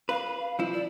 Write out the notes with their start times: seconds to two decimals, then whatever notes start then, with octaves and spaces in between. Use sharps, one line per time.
0.09 B4 F5
0.59 F3 E4
0.73 D5